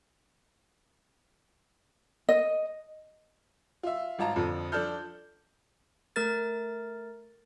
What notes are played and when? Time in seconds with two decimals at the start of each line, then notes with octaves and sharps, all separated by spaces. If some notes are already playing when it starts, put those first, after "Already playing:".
2.29 D#5
3.83 F4 E5
4.19 G#1 F4 A5 A#5
4.36 F2 D3 F3
4.72 F3 D4 A4 A5 F6 G6
6.16 A3 A#4 A6